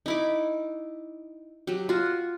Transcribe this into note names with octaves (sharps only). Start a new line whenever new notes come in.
D#4 E4 D6
F#3 G4
F4 F#4